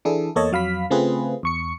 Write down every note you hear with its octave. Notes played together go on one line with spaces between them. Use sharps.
E3 D4 E4 G#4 A4
E2 A#3 A4 C#5 D#5 A5
F2 F#3 F5 B5 B6
C#3 A3 C4 F4 G#4 B4
E2 C#6 C#7